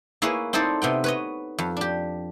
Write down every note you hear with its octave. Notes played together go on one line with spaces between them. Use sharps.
A#3 E4 G#4 B4 C#5
C4 D#4 E4 A4 C5 D5
C3 B3 G5
B4 C#5 D#5
F2
D4 G4